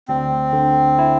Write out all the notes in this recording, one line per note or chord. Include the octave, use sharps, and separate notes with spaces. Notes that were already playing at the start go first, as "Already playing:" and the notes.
D2 C4
D3
E4